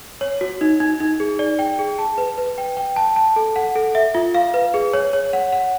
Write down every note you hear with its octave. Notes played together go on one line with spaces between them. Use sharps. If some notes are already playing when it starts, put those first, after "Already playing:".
C#5
F#4
D#4
D#4
D#4
G#4
D5
G5
G#4
A5
B4
B4
G5
G5
A5
A5
A4
F#5
A4
E5
F4
F5
B4
G#4
C#5
C#5
F#5
F#5